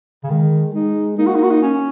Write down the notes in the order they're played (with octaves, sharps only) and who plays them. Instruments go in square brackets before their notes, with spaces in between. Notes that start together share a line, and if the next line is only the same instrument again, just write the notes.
[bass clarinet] C#3
[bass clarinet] D#3 [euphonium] G#3
[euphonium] G#3 [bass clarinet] D#4
[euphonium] A#3 [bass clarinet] D#4
[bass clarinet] F#4
D#4
F#4
D#4
C#4